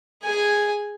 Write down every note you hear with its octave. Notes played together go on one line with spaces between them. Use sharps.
G#4 G#5